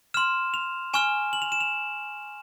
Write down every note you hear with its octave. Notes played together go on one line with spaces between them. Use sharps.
C6 F6 E7
F7
G#5 C#6 F6 E7
F#7
F7
E7
F7